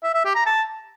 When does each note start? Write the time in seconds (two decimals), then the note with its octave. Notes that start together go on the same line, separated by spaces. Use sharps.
0.03 E5
0.14 E5
0.25 G4
0.35 A#5
0.46 A5